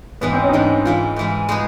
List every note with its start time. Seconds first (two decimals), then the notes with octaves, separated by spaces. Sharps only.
0.21 G#2 E3 G#3 B3
0.33 C4
0.42 C#4
0.49 D#4
0.53 G#2 E3 G#3 D4
0.85 G#2 E3 G#3 F4
1.16 G#2 E3 G#3
1.49 G#3 B3 D#4 G#4